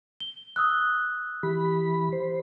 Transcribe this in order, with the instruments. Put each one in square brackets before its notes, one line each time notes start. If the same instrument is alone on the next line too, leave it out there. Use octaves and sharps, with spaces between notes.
[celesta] G7
D#6 E6 F#6
[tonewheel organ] E3 B5 [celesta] G4
[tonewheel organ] C5